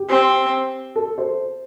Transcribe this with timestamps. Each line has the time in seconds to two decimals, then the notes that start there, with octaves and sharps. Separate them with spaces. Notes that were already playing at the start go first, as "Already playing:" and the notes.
Already playing: G4
0.09 C4
0.96 A4
1.18 C5